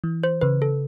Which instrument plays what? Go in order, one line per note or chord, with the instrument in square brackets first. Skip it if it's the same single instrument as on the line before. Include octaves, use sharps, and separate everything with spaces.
[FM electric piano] E3
[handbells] C5
[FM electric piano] C#3 [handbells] B4
[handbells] A4